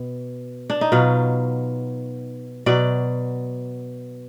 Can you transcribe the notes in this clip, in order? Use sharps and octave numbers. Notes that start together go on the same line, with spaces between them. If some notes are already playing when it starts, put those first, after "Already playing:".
Already playing: B2
D4
D#4
B2 F#3 F4
B2 F#3 D5